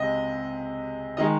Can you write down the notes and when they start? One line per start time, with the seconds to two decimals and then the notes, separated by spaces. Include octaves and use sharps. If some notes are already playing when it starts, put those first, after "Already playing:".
Already playing: C#2 C3 G#3 D#5
1.17 D#3 G#3 D#5